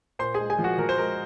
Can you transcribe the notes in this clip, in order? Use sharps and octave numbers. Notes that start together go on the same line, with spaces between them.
A#2 C5 C6
G#3 G#4 G#5
G#4 G#5
F3
F#4 F#5
F3 A#4
C5
G#3 A#4